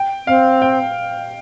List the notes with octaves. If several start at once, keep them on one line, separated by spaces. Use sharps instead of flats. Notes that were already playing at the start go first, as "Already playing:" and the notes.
Already playing: G5
C4 F5
G5